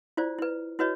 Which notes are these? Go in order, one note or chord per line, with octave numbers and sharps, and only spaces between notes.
E4 F4 C5 D5
E4 B4
E4 F#4 B4 C#5 D#5